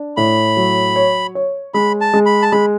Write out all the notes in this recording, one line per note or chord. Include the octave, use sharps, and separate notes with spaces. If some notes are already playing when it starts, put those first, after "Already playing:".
Already playing: D4
A2 B5
F#3
C#5
C#5
G#3 B5
A5
G#3
B5
A5
G#3 B5